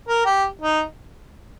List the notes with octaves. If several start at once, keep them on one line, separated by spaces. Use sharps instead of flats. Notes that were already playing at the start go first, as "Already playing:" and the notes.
A#4
G4
D#4